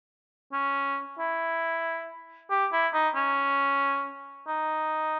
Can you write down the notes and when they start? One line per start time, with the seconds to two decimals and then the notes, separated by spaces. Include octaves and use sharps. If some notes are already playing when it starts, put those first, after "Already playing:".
0.53 C#4
1.19 E4
2.51 G4
2.73 E4
2.94 D#4
3.15 C#4
4.47 D#4